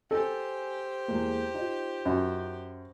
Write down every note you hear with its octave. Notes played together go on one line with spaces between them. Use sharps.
G4 A4 C5 G#5
E2 G#3 A#3
D#4 F4
F#2